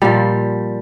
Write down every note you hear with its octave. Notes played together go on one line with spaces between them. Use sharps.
A#2 F3 G3